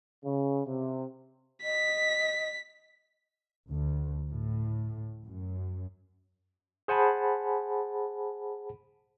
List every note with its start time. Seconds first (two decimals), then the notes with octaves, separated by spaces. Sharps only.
0.25 C#3
0.66 C3
1.63 D#5 B6
3.69 D2
4.29 A2
5.24 F#2
6.88 G#4 C5 F#5 G#5 A5 B5